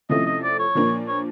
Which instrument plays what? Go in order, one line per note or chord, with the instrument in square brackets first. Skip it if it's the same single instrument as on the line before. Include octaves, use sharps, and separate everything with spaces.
[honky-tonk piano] C3 F3 A3 C#4 E4 [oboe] D#5
[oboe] D#5
D5
C#5
[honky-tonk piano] A#2 F3 A#3 D4
[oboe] C#5